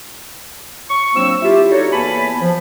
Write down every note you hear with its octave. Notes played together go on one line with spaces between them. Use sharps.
C#6
F3 F#3 A#3 C4 D4 E6
E4 F4 G4
D4 D#4 F#4 A4 C#5
E2 A#3 B3 G#5 A5 B5
F3